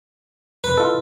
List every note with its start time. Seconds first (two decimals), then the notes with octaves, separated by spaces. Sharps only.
0.64 F2 C3 B4
0.77 E4 F4 A4 D#5